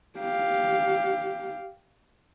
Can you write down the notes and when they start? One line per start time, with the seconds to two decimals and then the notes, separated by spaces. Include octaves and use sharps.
0.18 G4 F5